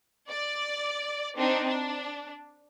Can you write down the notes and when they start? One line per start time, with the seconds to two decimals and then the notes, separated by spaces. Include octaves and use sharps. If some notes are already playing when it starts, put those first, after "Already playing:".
0.29 D5
1.37 C4 D4 D#4
1.67 D4